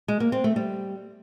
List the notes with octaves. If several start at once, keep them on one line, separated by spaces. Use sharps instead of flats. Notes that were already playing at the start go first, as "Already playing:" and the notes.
G#3
A#3
C4
A3
G3